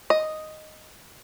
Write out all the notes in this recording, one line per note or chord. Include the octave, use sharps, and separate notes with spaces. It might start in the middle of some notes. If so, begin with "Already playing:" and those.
D#5